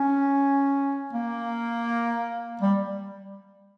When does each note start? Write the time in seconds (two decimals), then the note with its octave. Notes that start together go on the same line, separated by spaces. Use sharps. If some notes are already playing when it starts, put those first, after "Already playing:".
Already playing: C#4
1.13 A#3
2.62 G3